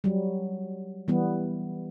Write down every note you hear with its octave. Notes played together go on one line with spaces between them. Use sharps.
F#3 G3
E3 G3 B3